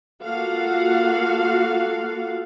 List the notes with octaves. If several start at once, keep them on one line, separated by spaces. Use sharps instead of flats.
A#3 F4 F#4 A4 F5 F#5